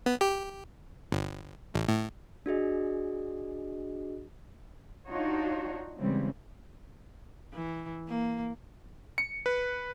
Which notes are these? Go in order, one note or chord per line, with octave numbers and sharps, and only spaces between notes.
B3
G4
G1
A1
A2
D4 F#4 G#4 D#5
D4 D#4 F4 F#4 C#5
C#3 E3 G3 G#3 C4
E3
A#3
C#7
B4